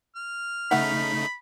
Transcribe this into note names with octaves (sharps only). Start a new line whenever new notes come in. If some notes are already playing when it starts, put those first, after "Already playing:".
F6
C#3 A3 D#4 E5 F#5 B5